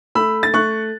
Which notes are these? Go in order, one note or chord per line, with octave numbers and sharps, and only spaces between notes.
A3 B5 E6
A6
A3 C#6 F#6